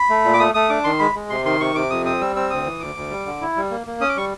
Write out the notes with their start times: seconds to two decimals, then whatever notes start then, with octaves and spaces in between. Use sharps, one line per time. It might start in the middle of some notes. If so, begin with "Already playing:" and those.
Already playing: B5
0.10 A3
0.25 A#2
0.34 D6
0.39 A3 D#6
0.54 A3 D#6
0.69 D4 D6
0.84 D#3 C6
0.99 G#3 B5
1.15 G#3
1.30 C3 C6
1.45 D#3 C6
1.60 C3 C#6
1.75 C3 D6
1.90 F2 D#6
2.05 C4 D#6
2.20 G3 E6
2.36 C4 E6
2.50 D2 D#6
2.65 E3
2.80 D2 D6
2.95 D2
3.11 G3
3.26 D3
3.41 E4
3.56 G3
3.71 A#3
3.87 A#3
4.01 C#4 D#6
4.09 D6
4.17 G3 C#6